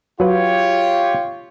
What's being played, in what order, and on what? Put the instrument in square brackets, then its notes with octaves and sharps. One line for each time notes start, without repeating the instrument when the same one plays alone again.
[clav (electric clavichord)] F#3 B4 [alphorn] F4 [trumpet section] G4 C#5